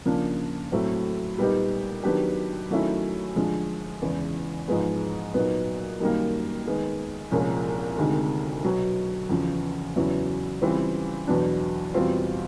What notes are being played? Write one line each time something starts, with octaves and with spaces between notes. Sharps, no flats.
C#3 F3 A#3 D4
A2 F#3 A3 C4
A#2 G3 B3 D#4 G4
D#3 F#3 B3 D4 G4
D#3 F#3 A3 C#4 E4
D3 F3 G#3
E2 C#3 E3 G#3
G#2 F3 G#3 B3
A#2 F#3 B3 D#4
F#2 D#3 G3 A#3
D#3 G#3 B3
C2 A#2 F3 G#3 C#4
D2 C3 D#3 G#3
B2 F#3 B3
E2 C#3 F3
E2 C#3 F#3 B3 E4
C#3 E3 G3 C4 F4
E2 B2 F#3 B3 D4
E2 B2 G3 C4 F4